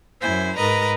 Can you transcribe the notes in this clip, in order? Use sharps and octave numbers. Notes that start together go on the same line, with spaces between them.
F#2 E4 C5 G#5
G#2 A#4 B4 D#5 A#5